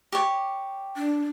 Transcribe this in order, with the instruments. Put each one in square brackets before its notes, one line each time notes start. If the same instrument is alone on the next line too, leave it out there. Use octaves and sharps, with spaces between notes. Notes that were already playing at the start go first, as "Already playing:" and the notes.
[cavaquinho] G4 C#5
[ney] D4